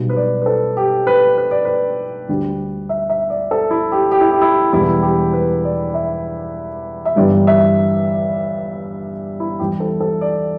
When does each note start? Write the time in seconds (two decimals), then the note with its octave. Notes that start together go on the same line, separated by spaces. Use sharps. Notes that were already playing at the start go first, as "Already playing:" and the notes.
Already playing: B1 B2 G3
0.10 B4
0.16 D5
0.42 B4
0.46 A4
0.77 G4
1.07 B4
1.38 B4
1.51 D5
1.65 B4
2.29 D2 D3 G3
2.89 E5
3.10 E5
3.30 D5
3.51 A4
3.71 E4
3.92 G4
4.12 G4
4.21 E4
4.31 G4
4.42 E4
4.73 E1 E2 E3 G3 E4
5.02 G4
5.33 B4
5.64 D5
5.94 E5
7.05 E5
7.16 G1 G2 E3 G3 D5
7.47 E5
9.40 E4
9.59 E2 E3 G3 G4
9.80 A4
10.00 A4
10.21 D5